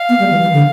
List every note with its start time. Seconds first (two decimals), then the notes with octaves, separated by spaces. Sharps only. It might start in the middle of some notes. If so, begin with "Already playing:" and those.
Already playing: F5
0.09 B3
0.20 G3
0.31 E3
0.41 E3
0.53 D3